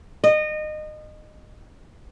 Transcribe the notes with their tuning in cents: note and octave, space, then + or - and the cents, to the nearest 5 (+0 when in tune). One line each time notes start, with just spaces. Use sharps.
D#5 -25